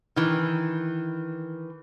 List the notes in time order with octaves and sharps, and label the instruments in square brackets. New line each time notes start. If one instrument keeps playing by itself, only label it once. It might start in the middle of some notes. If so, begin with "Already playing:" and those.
[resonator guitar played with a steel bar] D#3 E3